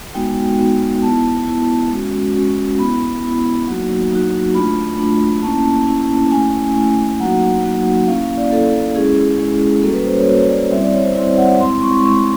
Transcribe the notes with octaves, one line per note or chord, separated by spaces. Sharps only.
G#3 B3 D#4 F#4 G5
G#3 B3 D#4 F#4
B3 E4 A5
B3 E4
G#3 C#4 F#4
G#3 C#4 F#4
B3 E4 B5
B3 E4
F#3 A#3 D#4 F#4
F#3 A#3 D#4 F#4
A3 D4 F4 B5
A3 D4 F4
A#3 C#4 E4 A5
A#3 C#4 E4
A3 C#4 E4 G#5
A3 C#4 E4
F#3 A#3 D#4 F#4 F#5
F#3 A#3 D#4 F#4
A#3 C#4 E4 F5
F5
D5
A#3 C#4 E4 A4
G#3 C#4 E4 G#4
G#3 C#4 E4
G3 A#3 C#4 F#4 A4
B4
C5
C#5
G3 A#3 C#4 F#4 C#5
C#5
D5
G3 C4 E4 E5
D5
C#5
C5
G3 C4 E4 D5
F#5
G#3 C4 E4 C6
C#6
G#3 C4 E4 C#6